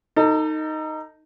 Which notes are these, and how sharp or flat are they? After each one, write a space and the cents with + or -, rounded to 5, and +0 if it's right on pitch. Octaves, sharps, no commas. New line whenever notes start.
D#4 +0 A4 +35